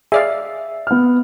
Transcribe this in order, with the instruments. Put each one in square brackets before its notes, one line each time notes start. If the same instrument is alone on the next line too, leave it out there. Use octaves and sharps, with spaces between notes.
[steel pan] G#4 D5 F5 [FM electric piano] E5
[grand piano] B3 F6